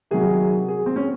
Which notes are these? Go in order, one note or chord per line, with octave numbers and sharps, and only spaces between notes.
C3 D#3 F#3 G#4
G#4
C4
C#4